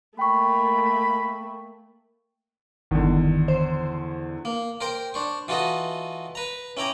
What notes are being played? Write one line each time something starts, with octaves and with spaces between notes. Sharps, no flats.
A3 A#3 G5 B5 C#6
G1 E2 D3 D#3
C5
A#3
A#4 C5 G5
D4 C5 C#6
E3 F4 F#4 A4 D#5
B4 A#5
C#4 E4 G5 A#5 D6